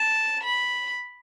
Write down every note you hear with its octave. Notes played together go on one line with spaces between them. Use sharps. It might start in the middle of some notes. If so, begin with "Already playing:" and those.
Already playing: A5
B5